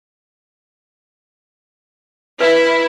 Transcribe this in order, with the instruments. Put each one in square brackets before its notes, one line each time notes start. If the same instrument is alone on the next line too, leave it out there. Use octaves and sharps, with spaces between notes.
[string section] E4 [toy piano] B4